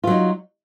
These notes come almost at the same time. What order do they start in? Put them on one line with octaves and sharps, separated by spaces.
F4 F#3 D#4